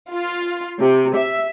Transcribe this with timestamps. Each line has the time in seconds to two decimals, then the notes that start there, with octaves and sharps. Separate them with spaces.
0.12 F4
0.79 C3
1.14 E5